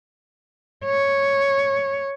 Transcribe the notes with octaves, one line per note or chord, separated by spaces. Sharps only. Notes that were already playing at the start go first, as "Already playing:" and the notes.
C#5